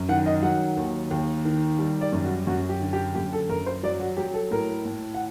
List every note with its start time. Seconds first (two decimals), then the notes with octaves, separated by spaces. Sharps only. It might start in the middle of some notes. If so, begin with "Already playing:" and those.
Already playing: F#2
0.09 D#3 F#5
0.26 D#5
0.43 F#3 F#5
0.77 D#2
1.11 D#2
1.45 D#3
1.79 G3
2.01 D5
2.12 F#2
2.25 F#4
2.47 F#2 F#4
2.69 G4
2.81 D3
2.93 G4
3.15 F#2 G4
3.33 A4
3.49 F#2 A#4
3.66 C5
3.83 F#3 D5
4.00 F#4
4.17 F#3 G4
4.34 A4
4.51 A2 A#4
4.85 A2
5.15 F#5